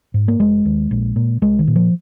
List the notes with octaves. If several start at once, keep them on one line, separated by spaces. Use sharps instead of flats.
G#2
A#3
F1 G#3
D#2
A#1
A#2
C2 G#3
D#3
A#2
F3